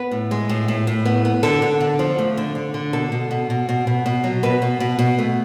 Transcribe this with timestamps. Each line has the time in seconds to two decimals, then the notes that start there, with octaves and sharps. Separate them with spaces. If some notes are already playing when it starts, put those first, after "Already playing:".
Already playing: B3 B4
0.11 A2
0.31 G#3
0.49 A2
0.68 A2
0.87 A2
1.05 B3
1.25 B3
1.43 D3 A4
1.62 D3
1.80 D3
1.99 F3
2.18 A3
2.37 D3
2.55 D3
2.74 D3
2.93 B2 A4
3.12 B2
3.31 B2
3.50 B2
3.69 B2
3.87 B2
4.06 B2
4.24 F#3
4.43 B2 B4
4.62 B2
4.80 B2
4.99 B2
5.19 A3